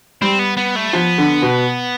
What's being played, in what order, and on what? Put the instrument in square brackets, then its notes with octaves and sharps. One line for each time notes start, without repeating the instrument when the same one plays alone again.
[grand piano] G3 [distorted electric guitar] C4
[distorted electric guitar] B3
B3
A3
[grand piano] F3 [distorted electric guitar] B3
[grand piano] D3
B2